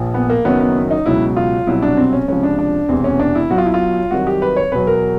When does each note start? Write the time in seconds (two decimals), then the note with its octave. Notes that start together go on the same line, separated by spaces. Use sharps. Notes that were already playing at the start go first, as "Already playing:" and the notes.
Already playing: A#1 A#2 F3
0.14 B3
0.30 A#3
0.45 F#1 F#2 D#3 F#3 B3
0.60 B3
0.91 D#4
1.06 C#2 B2 F#3 E4
1.37 F4
1.67 C2 B2 F#3 E4
1.82 D4
1.97 C4
2.13 C#4
2.28 C#2 C3 F3 C#4
2.43 D4
2.59 D4
2.89 E1 E2 C3 E3 C4
3.04 C#4
3.19 D4
3.35 E4
3.50 B1 B2 F#3 F#4
3.58 F4
3.66 E4
3.74 F4
4.11 C2 C3 D#3 F#3 F#4
4.27 G4
4.42 B4
4.56 C#5
4.72 E2 B2 F#3 B4
4.87 A#4